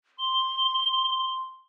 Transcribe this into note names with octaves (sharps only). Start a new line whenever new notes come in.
C6 G7